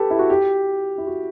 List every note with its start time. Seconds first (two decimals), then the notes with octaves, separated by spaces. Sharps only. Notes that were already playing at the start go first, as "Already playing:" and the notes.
Already playing: G4 A4 B4
0.10 E4
0.19 F#4
0.30 G4
0.98 E4
1.07 F#4